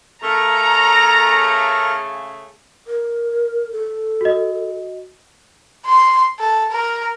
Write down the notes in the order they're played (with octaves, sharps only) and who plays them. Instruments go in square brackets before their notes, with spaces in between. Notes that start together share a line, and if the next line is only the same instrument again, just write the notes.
[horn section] C#3 A3 [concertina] A4 A#4 C#6 [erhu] A#5
[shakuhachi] A#4
A4
[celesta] F#4 D#5
[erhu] C6
A4
A#4